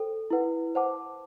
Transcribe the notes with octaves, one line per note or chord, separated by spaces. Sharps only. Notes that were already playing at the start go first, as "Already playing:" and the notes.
Already playing: A4 C5 G5
E4 B4 F#5
C5 F#5 A5 D6